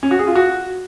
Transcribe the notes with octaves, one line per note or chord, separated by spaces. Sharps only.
C#4
F#4
G#4
F4
F#4